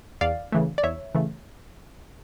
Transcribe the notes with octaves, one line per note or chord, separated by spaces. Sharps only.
E2 D5 F5
C#3 E3 A3
D5
E2 C#5 E5
C#3 E3 A3